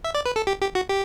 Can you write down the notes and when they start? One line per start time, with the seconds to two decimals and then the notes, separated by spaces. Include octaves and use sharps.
0.04 E5
0.15 D5
0.26 B4
0.36 A4
0.47 G4
0.61 G4
0.75 F#4
0.89 G4